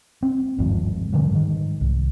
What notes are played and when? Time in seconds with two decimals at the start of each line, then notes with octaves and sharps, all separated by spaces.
0.23 C4
0.58 G1 D#2 G#2 F3
1.13 D3 F3 G3
1.31 G#2 D#3
1.81 C2